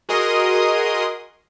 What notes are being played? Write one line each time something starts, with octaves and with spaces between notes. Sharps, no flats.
F#4 G#4 A#4 D#5 C6 D#6